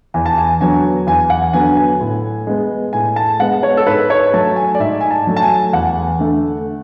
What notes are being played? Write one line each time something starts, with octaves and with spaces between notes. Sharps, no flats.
E2 G#5
A5
G#5
D3 F#3 B3 G#5
E2 G#5
F#5
D3 F#3 B3 G#5
G#5
A2
G#3 B3
A2 G#5
A5
G#3 B3 F#5
C#5
A4
G#2 B4
C#5
F#3 A3 A5
G#5
D5
G#2 E5
G#5
A5
F#3 A3
A5
G#5
E2 F#5
D3 A3